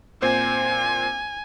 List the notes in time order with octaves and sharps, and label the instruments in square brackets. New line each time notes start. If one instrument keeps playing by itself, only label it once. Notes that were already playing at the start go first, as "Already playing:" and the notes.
[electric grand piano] A#2 C4 C5 [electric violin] G#5